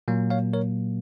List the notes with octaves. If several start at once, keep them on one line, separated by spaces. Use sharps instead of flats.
A#2 F#3 A#3
C#5 F5
A#4 C#5